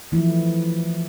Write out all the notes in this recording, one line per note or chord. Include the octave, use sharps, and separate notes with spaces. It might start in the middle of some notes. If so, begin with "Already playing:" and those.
E3 F3 A3 E4